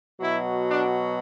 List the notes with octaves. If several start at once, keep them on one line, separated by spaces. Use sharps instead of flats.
B2 F#3 E4
D4